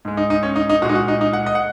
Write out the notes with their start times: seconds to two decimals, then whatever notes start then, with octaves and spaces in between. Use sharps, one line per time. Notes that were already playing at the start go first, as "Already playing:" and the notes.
0.05 G#2 G#3
0.17 D#4
0.30 D#4
0.43 C#4
0.56 D#4
0.69 D#4
0.82 A#2 G#3 F#4
0.89 D#4
0.95 F#4
1.08 D#4
1.21 D#4
1.33 F#5
1.46 D#5
1.55 F#5